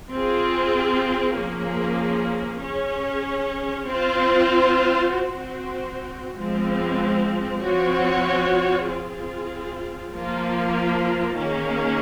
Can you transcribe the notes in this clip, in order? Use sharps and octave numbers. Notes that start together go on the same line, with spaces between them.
C4 F4 G#4
F3 A#3 C#4 G#4
C#4 G#4 C#5
C4 F4 C5
C4 F#4 C5
F3 G#3 C4
F3 C4 F#4 C#5
C4 F4 G#4
F3 A#3 F4
D#3 A#3 C#4 G#4